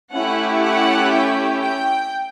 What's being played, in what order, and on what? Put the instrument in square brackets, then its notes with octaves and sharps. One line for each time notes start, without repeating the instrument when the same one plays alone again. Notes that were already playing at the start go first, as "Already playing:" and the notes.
[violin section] A3 C#4 E4 G4 F#5
F#5
G5
G5